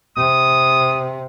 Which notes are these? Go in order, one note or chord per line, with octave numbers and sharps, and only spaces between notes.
C3 D#6